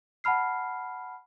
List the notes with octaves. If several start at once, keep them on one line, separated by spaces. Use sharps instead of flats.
F#5 A5 B5 F6 C7